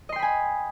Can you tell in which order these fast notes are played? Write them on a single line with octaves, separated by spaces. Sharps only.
D#5 C6 G5 B5 G#5